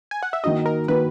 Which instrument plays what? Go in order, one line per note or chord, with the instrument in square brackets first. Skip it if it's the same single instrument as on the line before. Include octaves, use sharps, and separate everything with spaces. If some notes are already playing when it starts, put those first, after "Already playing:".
[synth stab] G#5
F#5
E5
[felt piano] D#3 A#3 D#4 F#4 [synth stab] D#5
[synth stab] A#4
[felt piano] D#3 A#3 D#4 F#4 [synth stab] B4